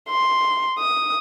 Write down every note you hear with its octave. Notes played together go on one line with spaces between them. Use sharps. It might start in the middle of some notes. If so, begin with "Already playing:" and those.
C6
D#6